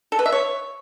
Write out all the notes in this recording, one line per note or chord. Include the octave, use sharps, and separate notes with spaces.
A4
B4
E5
C#5